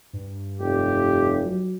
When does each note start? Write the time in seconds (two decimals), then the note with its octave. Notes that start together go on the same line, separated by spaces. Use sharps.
0.13 G2
0.59 F1 G4
1.46 F#3